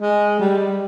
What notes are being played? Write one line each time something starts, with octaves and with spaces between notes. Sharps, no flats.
G#3
G3